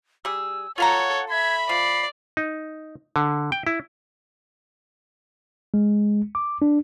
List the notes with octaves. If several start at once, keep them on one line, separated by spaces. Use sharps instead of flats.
G3 G#4 E6
F4 A4 C#5 F5 F#5 A#5
E5 B5 G#6
F3 D5 C7
D#4
D3
G5
E4
G#3
D6
D4